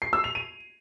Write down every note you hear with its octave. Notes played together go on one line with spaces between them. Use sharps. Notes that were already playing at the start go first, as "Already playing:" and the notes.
C7
E6
F7
D#7